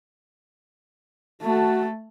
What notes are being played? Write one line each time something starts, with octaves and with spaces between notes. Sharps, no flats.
A3 F#4 A4